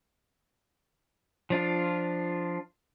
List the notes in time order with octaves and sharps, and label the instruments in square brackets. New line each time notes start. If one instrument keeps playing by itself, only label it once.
[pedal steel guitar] F3 D4 F4